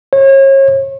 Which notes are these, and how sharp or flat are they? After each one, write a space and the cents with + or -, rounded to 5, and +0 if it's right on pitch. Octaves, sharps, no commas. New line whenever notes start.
C#5 -35